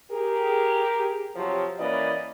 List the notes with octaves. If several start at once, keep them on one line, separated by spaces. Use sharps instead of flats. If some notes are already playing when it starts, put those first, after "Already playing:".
G4 G#4 A#4
C3 F3 F#3
E3 A#3 C#4 B4 D5 D#5